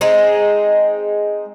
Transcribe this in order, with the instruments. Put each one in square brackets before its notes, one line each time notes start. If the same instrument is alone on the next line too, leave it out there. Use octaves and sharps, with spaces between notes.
[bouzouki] G#3 C4 D#4